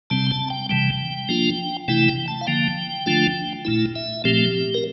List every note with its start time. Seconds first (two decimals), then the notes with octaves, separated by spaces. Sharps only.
0.10 C3 G3 C4 A5
0.31 A5
0.50 G5
0.69 C3 E3 G3 G5
1.29 F3 A#3 D4 F4
1.88 C3 E3 A3 E4 G5
2.08 G5
2.28 A5
2.41 F5
2.47 D3 F3 A#3 G5
3.06 D3 F3 A3 D4 F4
3.65 A#2 A3 E4
3.95 E5
4.24 A#2 F3 A3 C4 G4
4.74 A#4